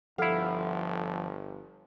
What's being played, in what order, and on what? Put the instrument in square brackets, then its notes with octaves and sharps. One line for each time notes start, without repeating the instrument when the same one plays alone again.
[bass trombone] G1 [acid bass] F3 [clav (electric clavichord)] E4 F5 [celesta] A4 F#5